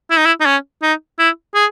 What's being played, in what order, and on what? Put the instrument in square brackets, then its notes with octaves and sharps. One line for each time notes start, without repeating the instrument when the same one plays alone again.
[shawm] E4
D#4
E4
D#4
C#4
D#4
E4
G#4